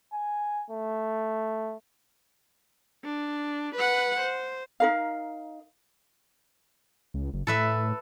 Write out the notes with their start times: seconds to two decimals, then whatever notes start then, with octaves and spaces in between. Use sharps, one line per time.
0.13 G#5
0.70 A3
3.04 D4
3.75 B4 F#5
4.20 C5
4.80 D#4 A#4 F5
7.14 C#2
7.33 F#1
7.47 A2 A4 B4 E5